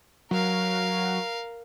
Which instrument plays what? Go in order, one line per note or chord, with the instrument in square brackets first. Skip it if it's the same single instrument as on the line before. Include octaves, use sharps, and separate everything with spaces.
[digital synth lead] F#3 [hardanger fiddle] A#4 F5